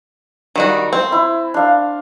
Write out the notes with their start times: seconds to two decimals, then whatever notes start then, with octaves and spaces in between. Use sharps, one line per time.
0.56 D#3 G3 F#4
0.93 C4
1.12 E4
1.54 D4 F5